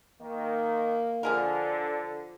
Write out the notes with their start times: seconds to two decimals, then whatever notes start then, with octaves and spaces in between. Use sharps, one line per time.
0.21 D#3 A#3
1.23 D3 F3 G#4 A#4